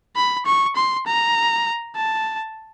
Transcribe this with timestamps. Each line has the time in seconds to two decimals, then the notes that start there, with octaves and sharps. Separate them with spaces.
0.16 B5
0.46 C#6
0.76 C6
1.06 A#5
1.96 A5